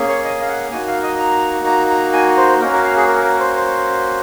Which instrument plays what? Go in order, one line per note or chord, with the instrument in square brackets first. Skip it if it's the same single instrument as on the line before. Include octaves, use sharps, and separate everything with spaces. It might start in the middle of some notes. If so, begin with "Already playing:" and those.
Already playing: [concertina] A#3 C#4 G#4
C#5
D#5
F5
F#5
A#3 D#4 F#4 G#5
F5
D#5
A#5
A#5
A#5
G#5
C5
A#3 C#4 F#4 A#4
A#4
F5
G#4
A#4
A#4
C5
C5